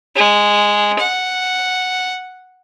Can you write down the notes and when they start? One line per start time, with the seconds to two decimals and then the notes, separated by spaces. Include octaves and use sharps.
0.16 G#3
1.00 F#5